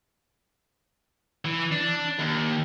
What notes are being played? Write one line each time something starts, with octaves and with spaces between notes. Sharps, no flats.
E3
D4
D#2